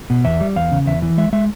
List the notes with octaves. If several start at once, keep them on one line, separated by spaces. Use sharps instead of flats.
B2
E2 E5
G3
E2 F5
C#3
E2 E5
E3
G#3 E5
G#3 E5